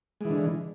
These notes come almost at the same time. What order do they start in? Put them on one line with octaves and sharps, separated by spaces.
G#3 E3 D3